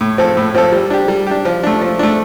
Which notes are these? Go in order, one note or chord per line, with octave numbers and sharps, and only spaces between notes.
A2
F3 C4 A4
A2
F3 C4 A4
G3
D4 G4
G3
D4 G4
F3
A3 D4
F3
A3 D4